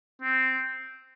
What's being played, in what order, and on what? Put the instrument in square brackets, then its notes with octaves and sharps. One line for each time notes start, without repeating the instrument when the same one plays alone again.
[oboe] C4